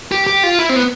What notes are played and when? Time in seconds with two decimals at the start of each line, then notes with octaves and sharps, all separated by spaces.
0.12 G4
0.27 G4
0.43 F4
0.59 E4
0.69 C4
0.76 B3